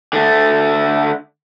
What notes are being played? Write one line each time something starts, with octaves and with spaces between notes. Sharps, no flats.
D3 A3